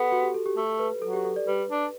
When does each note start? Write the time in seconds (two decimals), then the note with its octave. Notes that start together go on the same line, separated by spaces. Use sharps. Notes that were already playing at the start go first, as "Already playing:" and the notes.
Already playing: B3 G4 A4
0.12 F#4
0.23 G4
0.34 A4
0.46 G4
0.57 A3 A4
0.79 B4
1.02 F#3 A4
1.13 G4
1.25 A4
1.36 D5
1.47 G3 B4
1.70 D4